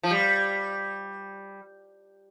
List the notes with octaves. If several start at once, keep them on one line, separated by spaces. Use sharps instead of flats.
F3
G3